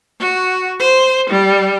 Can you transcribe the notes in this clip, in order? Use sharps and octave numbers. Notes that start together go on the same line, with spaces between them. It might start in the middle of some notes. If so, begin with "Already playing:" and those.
F#4
C5
G3